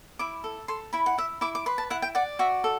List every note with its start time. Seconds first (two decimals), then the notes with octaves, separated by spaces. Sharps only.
0.19 E4 D6
0.44 A4
0.68 A4 C6
0.93 E4 B5
1.06 F#5
1.18 E4 E5
1.41 E4 D6
1.55 D6
1.66 B4 C6
1.78 A5
1.90 E4 F#5
2.02 G5
2.15 D5 F#5
2.39 F#4 E5
2.64 A4